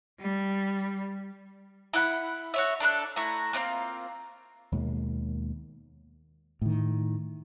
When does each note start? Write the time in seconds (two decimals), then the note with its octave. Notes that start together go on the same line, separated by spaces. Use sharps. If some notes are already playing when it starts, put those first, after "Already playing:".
0.20 G3
1.93 E4 F#5 B5
2.54 F#4 C#5 E5
2.80 D4 A4 A#5 F#6
3.16 A3 E4 A#5
3.53 A#3 C4 D#4 F4
4.72 D#2 B2 G#3 A#3
6.62 A2 D#3